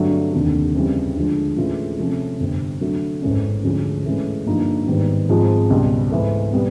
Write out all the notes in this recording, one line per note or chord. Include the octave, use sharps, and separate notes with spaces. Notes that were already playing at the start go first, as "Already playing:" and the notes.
Already playing: G2 D3 F#3 A3 D4
F1 D#2 D3
F2 C#3 E3 G3
D2 D3 F3 G#3
A2 E3 G#3 C#4 F4
C3 F3 A3 C#4
G1 F2 C3
D3 F#3 A3
A1 G#2 E3 A3 C#4
D2 D3 F3 G#3 C#4
A2 E3 G#3 C#4
G2 D3 F3 A#3 D#4
G#2 D#3 G3 B3
G#2 F3 G#3 C4 F4
C#2 B2 G3
G#2 E3 A3
B2 G3 B3